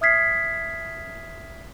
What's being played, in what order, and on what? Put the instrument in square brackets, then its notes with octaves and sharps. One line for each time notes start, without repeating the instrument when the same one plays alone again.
[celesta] E5 D#6 F6 G#6 B6 C7